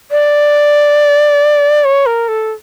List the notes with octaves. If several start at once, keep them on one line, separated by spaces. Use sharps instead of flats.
D5
C#5
A#4
A4